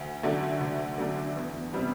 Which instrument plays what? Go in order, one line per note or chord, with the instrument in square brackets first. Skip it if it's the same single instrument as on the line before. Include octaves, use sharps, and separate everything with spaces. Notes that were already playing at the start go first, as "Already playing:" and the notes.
Already playing: [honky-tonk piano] D2
D3 F#3 A3 D4
D2
D3 F#3 A3 D4
E2
C3 G3 B3